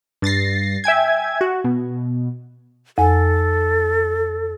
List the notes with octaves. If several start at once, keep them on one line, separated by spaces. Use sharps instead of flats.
G2 A6 A#6 C7
E5 G5 G#5 G#6
F#4
B2
F2 A4 G#5